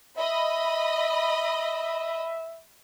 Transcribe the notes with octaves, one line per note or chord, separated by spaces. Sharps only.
D#5 E5 B5